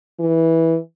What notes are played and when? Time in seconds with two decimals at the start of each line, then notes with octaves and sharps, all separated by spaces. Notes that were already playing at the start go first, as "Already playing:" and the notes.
0.20 E3